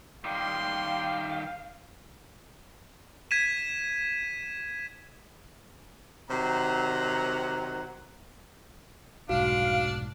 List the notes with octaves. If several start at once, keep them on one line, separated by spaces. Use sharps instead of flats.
D#3 G3 F5 G5 C6
G#6 B6 D#7 E7
C3 D#3 F#3 C5 F#5 A#5
F1 B1 G#2 D4 F#4 F5